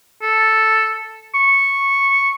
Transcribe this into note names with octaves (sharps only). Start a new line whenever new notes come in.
A4
C#6